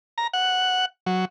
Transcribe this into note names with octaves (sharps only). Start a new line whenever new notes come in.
A#5
F#5
F#3